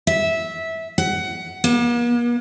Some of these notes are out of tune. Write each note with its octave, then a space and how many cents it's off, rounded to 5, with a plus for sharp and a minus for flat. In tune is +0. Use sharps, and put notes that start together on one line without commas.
E5 -15
F#5 +20
A#3 +45